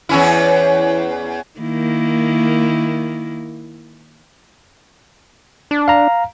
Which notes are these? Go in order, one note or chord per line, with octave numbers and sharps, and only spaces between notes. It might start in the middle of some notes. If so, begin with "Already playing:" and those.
E2 C#4 E4
D#3 A#3 E4
D4
F5 A#5